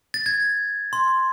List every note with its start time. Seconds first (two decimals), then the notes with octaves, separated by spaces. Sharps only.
0.14 A6
0.26 G#6
0.93 C6